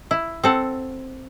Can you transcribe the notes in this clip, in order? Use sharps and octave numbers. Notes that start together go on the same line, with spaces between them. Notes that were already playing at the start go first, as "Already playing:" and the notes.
E4
C4 A4 F#5